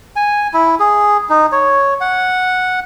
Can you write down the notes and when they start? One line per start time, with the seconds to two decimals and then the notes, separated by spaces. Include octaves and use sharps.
0.16 G#5
0.54 E4
0.80 G#4
1.30 D#4
1.52 C#5
2.01 F#5